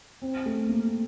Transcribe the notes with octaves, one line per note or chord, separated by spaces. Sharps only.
C4
A3
A#3